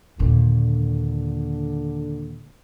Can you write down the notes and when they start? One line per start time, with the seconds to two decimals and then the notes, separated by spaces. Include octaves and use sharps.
0.19 D#2 A#2 D3